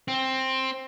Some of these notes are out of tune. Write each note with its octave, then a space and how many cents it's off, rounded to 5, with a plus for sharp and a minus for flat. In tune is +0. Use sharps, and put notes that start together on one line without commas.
C4 +10